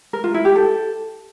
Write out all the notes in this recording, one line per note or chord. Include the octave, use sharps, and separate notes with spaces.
A#4
F4
E4
G4
A4